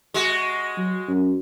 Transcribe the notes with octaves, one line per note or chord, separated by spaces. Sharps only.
G#3 F#4
F#3
F#2